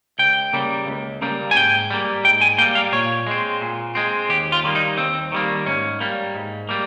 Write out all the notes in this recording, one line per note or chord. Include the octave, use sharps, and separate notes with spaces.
C#2 G5
C#3 G3 A#3
C#2
C#3 G3 A#3
G#5
G#2 G5
G3 A#3
G#2 G5
G#5
G3 A#3 G5
F5
A#2 C#5
G#3 C4
A#2
G#3 C4
D#2 G4
F4
D#3 G3 A#3
D#4
D#2 C4
D#3 G3 A#3
G#2 C#4
G3 A#3
G#2
G3 A#3